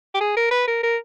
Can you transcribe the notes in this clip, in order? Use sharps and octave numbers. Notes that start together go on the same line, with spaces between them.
G4
G#4
A#4
B4
A#4
A#4